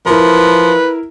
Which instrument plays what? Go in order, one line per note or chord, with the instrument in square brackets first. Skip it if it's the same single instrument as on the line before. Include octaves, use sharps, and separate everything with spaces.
[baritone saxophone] F3 [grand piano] E4 A#4 [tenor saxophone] B4